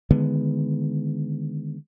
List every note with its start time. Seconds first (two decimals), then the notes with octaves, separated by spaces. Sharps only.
0.11 D3 D#3 G#3 B3